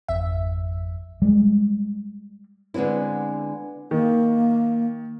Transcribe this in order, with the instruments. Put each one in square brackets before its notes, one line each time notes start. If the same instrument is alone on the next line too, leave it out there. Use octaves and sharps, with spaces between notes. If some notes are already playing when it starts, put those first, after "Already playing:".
[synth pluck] G#1 F2 E5
[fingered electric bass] G3 G#3
[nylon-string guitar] D3 G#3 B3 C4 E4
[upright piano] D#3 [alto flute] A#3